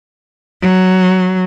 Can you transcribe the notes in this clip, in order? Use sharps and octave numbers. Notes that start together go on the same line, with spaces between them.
F#3